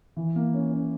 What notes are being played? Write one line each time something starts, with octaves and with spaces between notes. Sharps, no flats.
E3
A#3
C#4
C#4